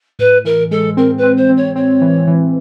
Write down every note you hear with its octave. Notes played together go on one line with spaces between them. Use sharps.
A2 B4
E3 A#4
G#3 A4
C4 A#4
B4
C4
C5
C4
C#5
C4 C#5
E3
E3